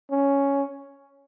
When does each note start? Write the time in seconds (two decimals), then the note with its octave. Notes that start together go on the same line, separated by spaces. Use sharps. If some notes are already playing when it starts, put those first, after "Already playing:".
0.11 C#4